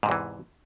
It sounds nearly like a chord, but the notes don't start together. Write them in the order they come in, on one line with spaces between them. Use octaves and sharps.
G#2 C3 E2 E3